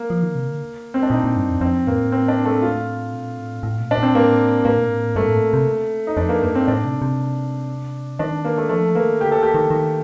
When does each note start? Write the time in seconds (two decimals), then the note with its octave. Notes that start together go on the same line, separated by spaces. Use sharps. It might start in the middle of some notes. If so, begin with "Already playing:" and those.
Already playing: A#3
0.10 F3
0.23 D#3
0.35 C3
0.48 D3
0.94 C4
1.03 D4
1.10 A#2 D#4
1.24 A#2
1.37 G2
1.49 F2
1.61 F2 C4
1.87 A2 A#3
2.12 C4
2.28 D4
2.45 A3
2.62 F4
3.13 A#2
3.38 A2
3.63 A2
3.80 A#2
3.91 D4
3.98 A#2
4.03 C4
4.15 A2 A#3
4.65 A2 A#3
4.78 A#2
4.89 A2
5.16 G2 A3
5.28 A2
5.53 C3
6.07 D#4
6.17 F2 D4
6.29 A#3
6.41 G2 A#3
6.55 C4
6.68 A2 D4
6.85 C3
7.02 C3
8.19 D#3 D4
8.45 A#3
8.57 A3
8.69 F3 A3
8.95 D#3 A#3
9.20 D3 G4
9.32 A4
9.38 D#3 G4
9.54 D#3
9.70 D#3